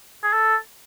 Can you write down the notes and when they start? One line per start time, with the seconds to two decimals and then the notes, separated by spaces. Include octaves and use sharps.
0.23 G#4
0.33 A4